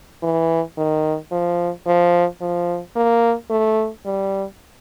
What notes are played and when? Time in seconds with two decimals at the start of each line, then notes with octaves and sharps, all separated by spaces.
0.23 E3
0.78 D#3
1.32 F3
1.87 F3
2.41 F3
2.96 A#3
3.50 A3
4.06 G3